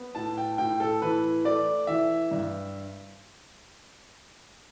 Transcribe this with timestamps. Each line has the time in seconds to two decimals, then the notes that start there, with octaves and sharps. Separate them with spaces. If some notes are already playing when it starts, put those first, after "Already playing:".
Already playing: B3
0.15 A2 A5
0.37 G5
0.58 A2 G5
0.80 A4
1.02 E3 B4
1.45 A3 D5
1.87 E3 E5
2.31 G2